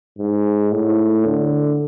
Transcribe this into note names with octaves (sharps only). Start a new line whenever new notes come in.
G#2
A2
D3